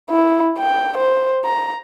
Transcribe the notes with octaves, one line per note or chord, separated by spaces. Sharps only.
E4
G5
C5
A#5